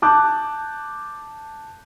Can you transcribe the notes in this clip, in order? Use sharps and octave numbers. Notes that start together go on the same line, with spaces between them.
A5 D6 F#6 G6